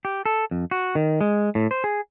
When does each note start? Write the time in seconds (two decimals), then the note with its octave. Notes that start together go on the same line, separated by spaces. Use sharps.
0.05 G4
0.26 A4
0.51 F2
0.71 F#4
0.95 D#3
1.21 G#3
1.55 A2
1.71 C5
1.84 G#4